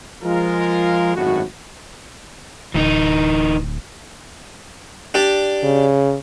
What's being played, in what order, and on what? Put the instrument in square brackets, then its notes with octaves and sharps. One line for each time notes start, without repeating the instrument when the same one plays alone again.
[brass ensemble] F3 G#3 F4 A#4
G#1 F#2 A2 G#3 F#4
[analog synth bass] D1 [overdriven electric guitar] E3 D#4
[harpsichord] D4 G4 D5
[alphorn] C#3